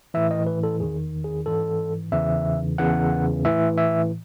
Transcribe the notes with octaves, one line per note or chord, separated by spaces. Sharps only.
A2 E3 E5
D#5
B4
A4
E2 D#3 G#4
G#4
G#2 E3 A4
E2 C#3 E3 E5
E2 C#3 E3 F#5
A2 E3 E5
E5